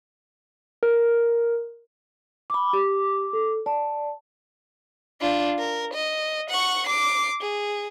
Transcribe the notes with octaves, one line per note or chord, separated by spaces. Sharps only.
A#4
B5 D6
G4 D6
A4
D5 A5
D4 F4
A#4
D#5
F#5 C#6
D6 C7
G#4